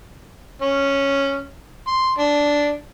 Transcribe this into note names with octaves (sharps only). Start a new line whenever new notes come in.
C#4
C6
D4